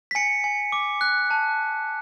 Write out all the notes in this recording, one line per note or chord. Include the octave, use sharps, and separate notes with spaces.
B6
G#5 C#7
G#5
D6
F#6
A5